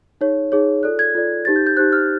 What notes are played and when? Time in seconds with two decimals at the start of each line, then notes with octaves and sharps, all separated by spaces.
0.21 D#4 G#4 C#5
0.52 D#4 G#4 C#5
0.83 F4 A4 D5 F#6
0.99 G#6
1.15 F4 A4 D5
1.45 D#4 G4 C5 A6
1.56 G6
1.67 G6
1.77 D#4 G4 C5 F#6
1.93 F6